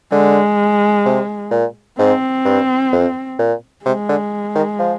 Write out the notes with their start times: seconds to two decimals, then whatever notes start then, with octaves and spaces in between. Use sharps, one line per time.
0.12 D3 G#3
1.05 C3
1.51 A#2
1.98 G#2 C4
2.45 G2
2.92 F2
3.39 A#2
3.85 C3 G#3
4.09 D3
4.55 D#3
4.79 F3